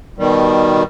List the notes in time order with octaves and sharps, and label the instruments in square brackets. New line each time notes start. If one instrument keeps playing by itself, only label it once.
[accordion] B2 D#3 G3